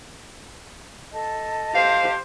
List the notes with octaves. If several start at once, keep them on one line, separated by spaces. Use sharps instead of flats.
A4 D#5 A5
G4 C5 F5